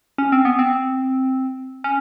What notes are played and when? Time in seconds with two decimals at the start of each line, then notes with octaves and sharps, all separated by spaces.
0.18 C#4
0.32 C4
0.45 B3
0.59 C4
1.84 C#4